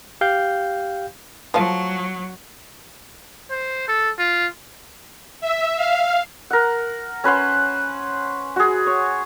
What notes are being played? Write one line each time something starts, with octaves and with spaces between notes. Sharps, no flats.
G4 F5 G5 G6
F3 F#3 A3 F5
C5
A4
F4
E5
F5
A#4 F#5
C#4 B4 C5 F#5
F#4 G#4
C#5